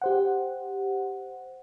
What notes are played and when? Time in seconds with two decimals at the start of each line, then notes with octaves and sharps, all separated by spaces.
0.02 G4 C5 F#5